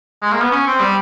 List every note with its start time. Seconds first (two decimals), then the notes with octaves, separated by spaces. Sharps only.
0.22 G#3
0.31 A#3
0.41 B3
0.51 C#4
0.67 C4
0.80 G3